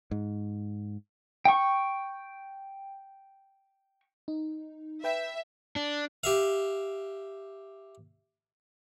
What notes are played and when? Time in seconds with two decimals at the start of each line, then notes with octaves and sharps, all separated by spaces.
0.11 G#2
1.45 G5 C#6
4.28 D#4
5.04 B4 E5 G5
5.76 D4
6.24 G4 E5 F5